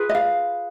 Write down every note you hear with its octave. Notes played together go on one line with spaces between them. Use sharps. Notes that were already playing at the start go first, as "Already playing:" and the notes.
Already playing: F4 G#4 B4
D#5
F5